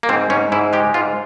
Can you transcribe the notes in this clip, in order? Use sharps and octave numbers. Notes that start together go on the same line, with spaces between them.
A#3
G#2 C4
G#2 C#4
G#2 E4
G#3 G4
G#2 F4